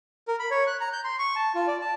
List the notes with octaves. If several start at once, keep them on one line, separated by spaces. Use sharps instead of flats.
A#4
B5
C#5
F#6
A#5
G6
C6
C#6
A5
F4
D5
A5